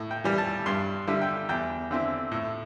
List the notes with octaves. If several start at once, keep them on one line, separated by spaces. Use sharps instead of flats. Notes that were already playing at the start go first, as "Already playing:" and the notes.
Already playing: A2
G5
E3 G3
A5
G2 C6
D3 G3 E4
G5
E2 G5
D3 C4 E4
A2